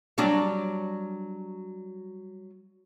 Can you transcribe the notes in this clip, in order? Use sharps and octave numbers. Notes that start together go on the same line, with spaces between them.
F#3 G3 D4